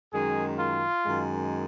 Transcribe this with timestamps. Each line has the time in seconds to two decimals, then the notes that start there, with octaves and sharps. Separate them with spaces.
0.11 F#2 D#3 G#3 G#4
0.59 F4
1.05 F#2 D#3 G#3